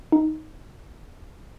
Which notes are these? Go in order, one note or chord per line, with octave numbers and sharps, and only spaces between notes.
D#4